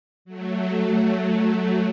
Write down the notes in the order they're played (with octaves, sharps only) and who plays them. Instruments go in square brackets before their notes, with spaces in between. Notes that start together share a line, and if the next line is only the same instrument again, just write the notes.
[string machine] F#3 A3